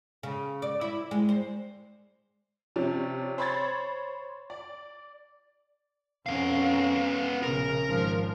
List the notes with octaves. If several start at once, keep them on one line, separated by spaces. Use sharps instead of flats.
C#3
D5
E4
G#3
C5
C3 F3 C#4 D4
C5 C#5 B5 C6 G#6 A6
D5
F2 B3 C#4 F5
A#1 C#3 A#4
G#1 F3